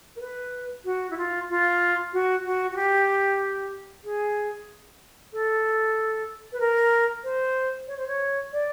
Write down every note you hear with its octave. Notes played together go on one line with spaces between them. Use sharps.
A#4
B4
F#4
E4
F4
F4
F#4
F#4
F#4
G4
G#4
A4
B4
A#4
C5
C#5
C5
C#5
D5